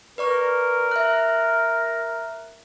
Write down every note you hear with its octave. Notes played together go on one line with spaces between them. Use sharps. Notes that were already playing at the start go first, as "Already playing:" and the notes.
A#4 B4 D5 C#6
E5 F#6